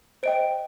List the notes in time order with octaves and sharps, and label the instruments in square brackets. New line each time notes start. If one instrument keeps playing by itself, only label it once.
[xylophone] C5 D#5 G5 D7